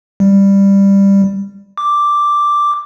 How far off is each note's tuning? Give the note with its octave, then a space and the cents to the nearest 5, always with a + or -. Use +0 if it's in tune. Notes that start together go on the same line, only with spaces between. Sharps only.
G3 +10
D6 +0